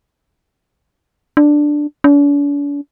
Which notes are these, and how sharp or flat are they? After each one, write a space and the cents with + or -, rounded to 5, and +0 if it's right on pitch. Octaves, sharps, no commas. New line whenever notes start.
D4 +5
D4 -45